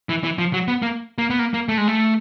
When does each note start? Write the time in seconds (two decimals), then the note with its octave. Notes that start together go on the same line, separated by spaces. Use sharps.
0.09 E3
0.24 E3
0.39 F3
0.53 F#3
0.68 B3
0.82 A#3
1.18 A#3
1.30 B3
1.39 A#3
1.54 A#3
1.69 A3
1.78 G#3
1.88 A3